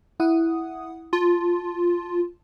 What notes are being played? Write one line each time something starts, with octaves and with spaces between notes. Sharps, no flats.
E4 F#5 D#6
F4 A5